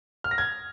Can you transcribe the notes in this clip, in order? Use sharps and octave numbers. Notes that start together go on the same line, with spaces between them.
F6
A#6
G#6